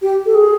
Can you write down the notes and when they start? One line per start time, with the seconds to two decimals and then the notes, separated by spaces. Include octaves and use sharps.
0.02 G4
0.26 A4
0.35 G#4